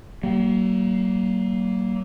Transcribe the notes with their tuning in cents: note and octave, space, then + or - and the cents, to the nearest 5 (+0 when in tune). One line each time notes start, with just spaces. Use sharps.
F#3 +45 A#3 +0